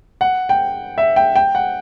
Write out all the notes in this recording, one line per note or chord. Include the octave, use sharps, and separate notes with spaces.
F#5
G5
E5
G5
G5
F#5